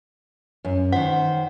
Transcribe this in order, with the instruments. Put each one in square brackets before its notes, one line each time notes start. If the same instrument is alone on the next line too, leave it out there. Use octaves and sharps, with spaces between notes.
[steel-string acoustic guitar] F#2
[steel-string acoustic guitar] D#3 C5 [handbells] F#5